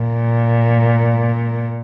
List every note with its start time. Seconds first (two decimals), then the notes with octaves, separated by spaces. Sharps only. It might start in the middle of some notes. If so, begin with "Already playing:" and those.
Already playing: A#2